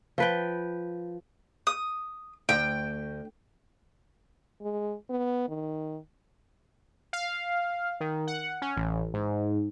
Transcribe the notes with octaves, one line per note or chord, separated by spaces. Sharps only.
F3 B4 G5
D#6
D2 G5
G#3
B3
D#3
F5
D#3
F#5
C#4
A1
G#2